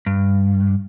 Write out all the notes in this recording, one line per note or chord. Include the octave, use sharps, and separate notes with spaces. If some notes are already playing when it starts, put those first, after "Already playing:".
G2